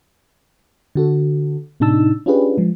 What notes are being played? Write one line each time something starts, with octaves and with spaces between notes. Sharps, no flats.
D3 F#4 A4
A2 C3 D4 D#4 A5 E6
C#4 D4 F4 G4 G#4 B4
F3 G#3